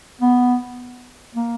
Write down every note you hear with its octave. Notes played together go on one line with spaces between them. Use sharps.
B3
A#3